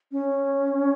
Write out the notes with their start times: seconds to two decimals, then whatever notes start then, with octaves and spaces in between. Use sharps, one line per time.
0.12 C#4